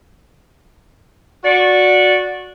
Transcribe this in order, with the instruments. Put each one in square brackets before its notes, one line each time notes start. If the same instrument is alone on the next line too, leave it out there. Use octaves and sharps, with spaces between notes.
[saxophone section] F#4 D5